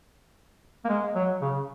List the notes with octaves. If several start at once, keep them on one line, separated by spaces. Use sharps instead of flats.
A#3
G#3
F#3
C#3